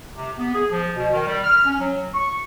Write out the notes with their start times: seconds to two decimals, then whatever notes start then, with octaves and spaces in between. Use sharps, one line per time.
0.15 C3
0.39 B3
0.54 G#4
0.71 F3
0.96 B2
1.13 D#3
1.27 G3
1.43 F6
1.65 C#4
1.79 F#3
2.14 C#6